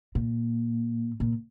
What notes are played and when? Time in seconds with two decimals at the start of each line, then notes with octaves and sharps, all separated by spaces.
0.15 A#2
1.20 A#2